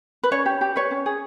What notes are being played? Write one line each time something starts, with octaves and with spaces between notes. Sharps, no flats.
B4
C#4 C#5
G4
G4
B4 C#5
C#4
G#4